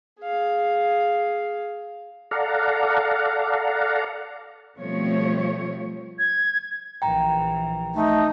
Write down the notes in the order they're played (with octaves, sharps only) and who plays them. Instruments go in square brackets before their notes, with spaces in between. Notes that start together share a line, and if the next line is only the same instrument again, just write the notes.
[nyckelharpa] G#4 F5
[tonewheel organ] A4 D5 F5 F#5 A#5
[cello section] B2 F3 G3 A3 C4 C#5
[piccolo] G#6
[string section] A#1 E3 [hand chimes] G5 A#5
[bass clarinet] A3 [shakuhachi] D#4